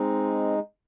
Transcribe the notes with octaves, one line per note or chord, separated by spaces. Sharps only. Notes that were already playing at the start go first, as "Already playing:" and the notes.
Already playing: G#3 C4 D#4